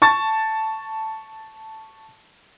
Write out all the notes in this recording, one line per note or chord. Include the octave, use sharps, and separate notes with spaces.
A5 C#6 A6